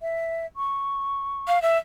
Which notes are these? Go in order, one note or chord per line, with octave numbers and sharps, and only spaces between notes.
E5
C#6
F5
E5